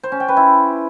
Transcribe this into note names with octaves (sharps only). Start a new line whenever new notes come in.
C5
C#4
G5
B4
E4